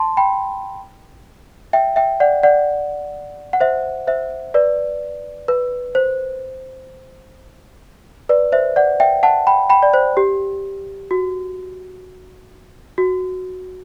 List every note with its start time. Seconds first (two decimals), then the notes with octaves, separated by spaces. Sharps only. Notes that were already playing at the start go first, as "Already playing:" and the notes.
Already playing: A5 C6
0.17 G5 B5
1.73 E5 G5
1.96 E5 G5
2.20 D5 F#5
2.43 D5 F#5
3.53 F#5
3.60 C5 E5
4.07 C5 E5
4.54 B4 D5
5.48 B4
5.95 C5
8.29 B4 D5
8.52 C5 E5
8.76 D5 F#5
9.00 E5 G5
9.23 F#5 A5
9.47 G5 B5
9.69 G5 B5
9.83 D5
9.94 C5
10.17 G4
11.11 F#4
12.98 F#4